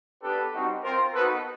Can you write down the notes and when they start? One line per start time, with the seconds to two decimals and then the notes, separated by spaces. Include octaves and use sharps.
0.22 B3 D4 G4 A4 B4
0.53 G3 C4 D#4 F#4
0.83 C4 F4 A#4 C5
1.13 B3 D#4 F#4 A4 B4